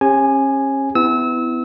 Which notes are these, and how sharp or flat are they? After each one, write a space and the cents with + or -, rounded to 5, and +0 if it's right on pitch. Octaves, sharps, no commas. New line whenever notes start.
C#4 -35 G4 +40 G#5 +0
B3 +30 E4 +0 E6 -30